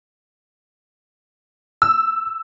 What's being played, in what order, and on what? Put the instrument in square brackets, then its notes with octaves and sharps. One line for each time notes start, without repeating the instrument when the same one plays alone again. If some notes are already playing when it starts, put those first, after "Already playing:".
[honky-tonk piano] E6